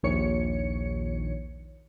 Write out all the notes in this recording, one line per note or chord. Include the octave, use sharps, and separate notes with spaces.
A#1 D#2 C#5 C#7